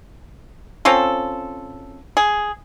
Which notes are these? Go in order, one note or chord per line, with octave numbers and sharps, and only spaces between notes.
C4 C#4 F4 A4
G#4